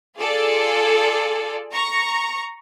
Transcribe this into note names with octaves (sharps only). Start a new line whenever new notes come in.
F4 G#4 A4 D5
A#5 C#6